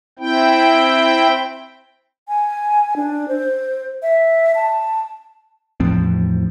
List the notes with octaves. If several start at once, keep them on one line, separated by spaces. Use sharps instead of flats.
C4 E4 G5
G#5
D4
C5
E5
A5
E2 A2 F3 C4